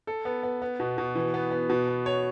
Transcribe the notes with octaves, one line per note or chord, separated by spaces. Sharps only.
A4
B3
B3
B3
B2
B2
E3
B3
B3
B2
B3
C#5